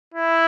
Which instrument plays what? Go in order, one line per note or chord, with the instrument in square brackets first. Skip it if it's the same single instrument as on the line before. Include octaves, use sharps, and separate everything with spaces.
[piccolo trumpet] E4